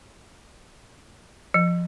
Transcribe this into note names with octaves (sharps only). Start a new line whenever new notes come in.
F3